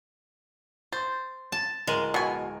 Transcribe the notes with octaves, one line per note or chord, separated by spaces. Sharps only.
C5 A6
A5
D1 G#3 A#4 D#7
B2 G#5